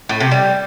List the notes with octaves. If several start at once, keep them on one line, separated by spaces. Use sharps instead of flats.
A2
C3
G3